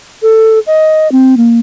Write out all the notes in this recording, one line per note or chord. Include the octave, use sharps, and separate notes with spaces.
A4
D#5
C4
A#3